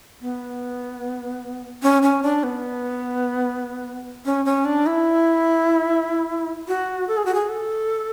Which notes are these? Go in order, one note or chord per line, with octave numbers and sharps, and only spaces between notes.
B3
C#4
C#4
D4
B3
C#4
C#4
D4
E4
F#4
A4
G#4
F#4
G#4
A4